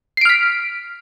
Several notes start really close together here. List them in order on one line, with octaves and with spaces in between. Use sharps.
C7 D7 F6 B6